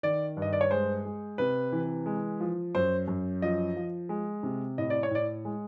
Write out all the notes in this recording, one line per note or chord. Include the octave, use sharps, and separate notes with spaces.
D#3 D5
G2
D#5
D5
C#5
G#3 C5
G#3
C3 B4
E3
G#3
F3
F#2 C5
F#2
F3 D#5
F3
G#3
C3
A2 D#5
D5
C#5
A2 D5
G#3